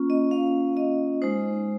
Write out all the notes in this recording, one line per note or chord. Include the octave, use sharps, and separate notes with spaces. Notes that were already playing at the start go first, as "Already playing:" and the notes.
Already playing: A#3 C#4 F4
D#5
F5
D#5
G#3 D#4 C5